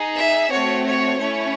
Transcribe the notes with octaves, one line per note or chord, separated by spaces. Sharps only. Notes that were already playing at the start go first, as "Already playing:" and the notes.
Already playing: D#4 G#4
E5
A3 C4 F#4 C#5
C#5
A3 C#4 E4 C#5